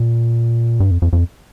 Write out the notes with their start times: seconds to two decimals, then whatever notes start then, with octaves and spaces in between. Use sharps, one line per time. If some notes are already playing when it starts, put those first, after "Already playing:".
Already playing: A#2
0.80 G2
0.91 F2
1.02 F2
1.13 F2